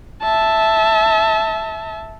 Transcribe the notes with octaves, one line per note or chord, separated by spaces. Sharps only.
E5 A5